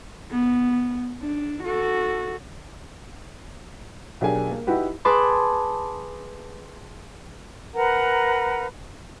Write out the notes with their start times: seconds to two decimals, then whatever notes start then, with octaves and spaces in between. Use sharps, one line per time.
0.31 B3
1.22 D4
1.63 F#4 A4
4.21 B1 D4 G4 G#4 A#4 G#5
4.51 A#3
4.67 D#4 E4 F#4 G4 B4
5.05 G#4 B4 A5 C6 D6
7.74 A#4 B4 F#5 A#5